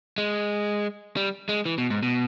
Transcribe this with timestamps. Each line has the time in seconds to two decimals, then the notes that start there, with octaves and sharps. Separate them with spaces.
0.18 G#3
1.16 G3
1.49 G#3
1.65 E3
1.78 B2
1.90 G#2
2.03 B2